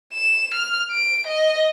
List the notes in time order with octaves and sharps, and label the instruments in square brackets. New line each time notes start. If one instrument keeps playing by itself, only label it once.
[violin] E7
F6
D7
D#5